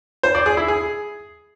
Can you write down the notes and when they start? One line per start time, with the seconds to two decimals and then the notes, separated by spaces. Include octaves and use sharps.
0.23 C5
0.35 D5
0.46 G#4
0.57 E4
0.68 G#4